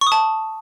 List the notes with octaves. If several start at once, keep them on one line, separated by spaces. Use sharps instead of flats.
C#6
D#6
A5